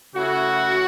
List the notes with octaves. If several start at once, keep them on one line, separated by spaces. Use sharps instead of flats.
C#3 A3 E4 F#4